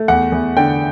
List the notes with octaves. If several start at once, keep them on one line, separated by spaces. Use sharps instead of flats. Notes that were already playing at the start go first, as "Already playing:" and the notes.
Already playing: A3
E2 F#5
E2
D3 G5